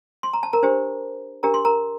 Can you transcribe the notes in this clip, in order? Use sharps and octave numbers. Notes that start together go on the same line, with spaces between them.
C6
A#5
A5
A#4 A#5
D4 G4 C5
D4 G4 A#4 A#5
C6
A#4 A#5